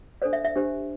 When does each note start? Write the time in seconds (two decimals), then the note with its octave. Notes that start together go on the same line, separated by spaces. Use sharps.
0.22 D4 A4 C5 D5
0.33 E5
0.44 E5
0.56 D4 G4 C5